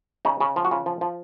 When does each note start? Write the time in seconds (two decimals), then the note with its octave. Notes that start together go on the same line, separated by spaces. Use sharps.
0.25 C#3 D#4
0.40 C#3
0.56 F3
0.65 F#4
0.71 C#3 F4
0.86 F3
1.01 F3